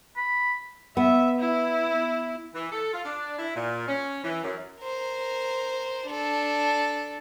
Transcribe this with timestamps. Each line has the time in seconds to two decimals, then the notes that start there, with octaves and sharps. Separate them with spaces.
0.17 B5
0.97 B3 E5
1.39 E4
2.55 E3
2.72 A4
2.93 F4
3.05 D4
3.39 E4
3.56 A#2
3.88 C#4
4.24 E3
4.43 F#2
4.83 A#4 C5
6.07 D4 A4